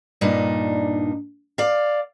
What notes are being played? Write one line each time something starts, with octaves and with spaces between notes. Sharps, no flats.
G2 A#2 D4 D#4
D5 F5